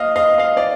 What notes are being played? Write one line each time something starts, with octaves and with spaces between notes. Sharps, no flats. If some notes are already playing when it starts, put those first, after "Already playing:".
Already playing: D#2 D#5 F5
D#5 F5
D#5 F5
D5